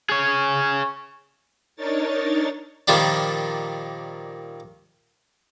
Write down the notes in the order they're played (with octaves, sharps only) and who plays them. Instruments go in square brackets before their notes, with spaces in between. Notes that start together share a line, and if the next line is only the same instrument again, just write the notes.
[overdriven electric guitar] G#4 C#5
[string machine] D4 D#4 A#4 C#5 A6
[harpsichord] A#2 D#3 F3 G3 D4